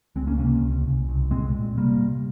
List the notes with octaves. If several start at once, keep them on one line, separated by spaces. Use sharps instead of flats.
C#2 G#3 C4
A#3 C#4
C3 A#3 C#4
C#2
C2
C2
A#2 G#3 C4
A#2
C3 G3 A#3
C3